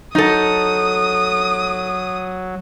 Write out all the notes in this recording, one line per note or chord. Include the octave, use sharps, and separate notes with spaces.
F#3 D#4 A4 D#6